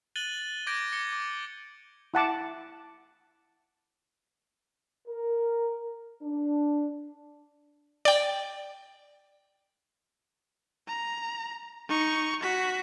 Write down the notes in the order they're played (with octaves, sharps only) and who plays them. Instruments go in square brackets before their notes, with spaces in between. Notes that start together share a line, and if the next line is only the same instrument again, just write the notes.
[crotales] F#6 A6 D#7 F#7 G7
D6 G6 G#6 A#6 D7
D6 G#6 C#7 G7
D6
[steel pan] E4 F#5 A5 D6
[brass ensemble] A#4
D4
[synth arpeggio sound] D5 G5
[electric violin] A#5
D#4 C#6
F#4 B6